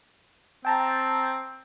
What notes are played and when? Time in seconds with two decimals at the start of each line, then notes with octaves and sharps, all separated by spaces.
0.65 C4 G5 A5 A#5